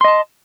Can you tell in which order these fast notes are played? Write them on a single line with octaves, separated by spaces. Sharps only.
C6 D#5 A5